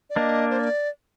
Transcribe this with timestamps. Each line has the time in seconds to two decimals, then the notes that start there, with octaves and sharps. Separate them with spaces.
0.10 D5
0.16 A#3 D4 D#5
0.50 C5
0.59 D5